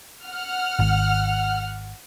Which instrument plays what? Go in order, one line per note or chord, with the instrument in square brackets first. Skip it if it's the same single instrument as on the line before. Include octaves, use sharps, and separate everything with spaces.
[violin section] F#5 F6
[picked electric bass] G#1